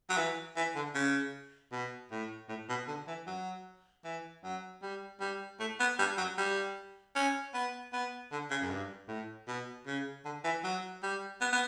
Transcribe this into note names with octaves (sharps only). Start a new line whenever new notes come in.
F#3
E3
E3
D3
C#3
B2
A2
A2
B2
D3
E3
F#3
E3
F#3
G3
G3
A3
B3
G3
F#3
G3
C#4
B3
B3
D3
C#3
F#2
G2
A2
B2
C#3
D3
E3
F#3
G3
B3
B3